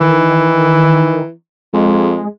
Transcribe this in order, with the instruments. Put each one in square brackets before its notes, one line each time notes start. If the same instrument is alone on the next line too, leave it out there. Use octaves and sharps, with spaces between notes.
[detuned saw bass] D#3 [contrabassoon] E3
[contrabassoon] F2 [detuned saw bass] G#3